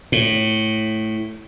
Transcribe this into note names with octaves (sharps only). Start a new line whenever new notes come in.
A2